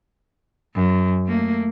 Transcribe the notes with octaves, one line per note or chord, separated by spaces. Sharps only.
F#2
A3 A#3